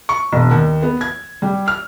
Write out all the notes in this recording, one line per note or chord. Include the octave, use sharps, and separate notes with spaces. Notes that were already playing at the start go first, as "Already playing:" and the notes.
C#6
E1
D#2
B3
G#6
G3
F6